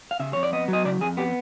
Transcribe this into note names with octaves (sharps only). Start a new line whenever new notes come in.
F5
C#3 E5
F2 C#5
D5
B3 D#5
F#3 D#5
C#3 D5
F2 G#4
B3 G4